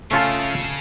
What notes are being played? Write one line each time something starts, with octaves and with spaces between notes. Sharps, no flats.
C#3 A3 C#4 F4 A4